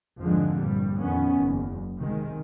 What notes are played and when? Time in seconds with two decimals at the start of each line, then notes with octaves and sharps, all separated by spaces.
0.20 G#1 F2 G#2 D3 F3 G#3
0.55 A#1 G2 G3
1.00 A#1 F2 D#3 B3 C#4
1.37 F#1 E2
1.97 B1 C3 D#3 G#3